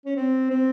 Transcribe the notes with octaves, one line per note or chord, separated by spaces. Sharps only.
C#4
C4
C4